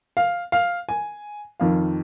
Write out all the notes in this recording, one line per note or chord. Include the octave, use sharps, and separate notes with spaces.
F5
F5
G#5
F2 D#3 F5